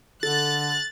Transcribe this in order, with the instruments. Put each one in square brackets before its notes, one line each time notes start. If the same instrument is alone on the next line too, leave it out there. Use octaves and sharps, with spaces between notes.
[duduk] D3 [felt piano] A4 [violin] F#6 [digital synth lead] A6